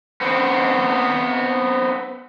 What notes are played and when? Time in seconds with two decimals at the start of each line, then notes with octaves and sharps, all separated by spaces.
0.21 B3 C4